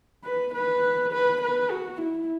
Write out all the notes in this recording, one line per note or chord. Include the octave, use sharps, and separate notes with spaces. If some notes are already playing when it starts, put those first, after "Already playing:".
B4
B4
B4
B4
F#4
E4